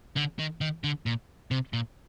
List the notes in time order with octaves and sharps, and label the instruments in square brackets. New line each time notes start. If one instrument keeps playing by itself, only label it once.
[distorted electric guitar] D3
D#3
D#3
D3
A#2
C3
A#2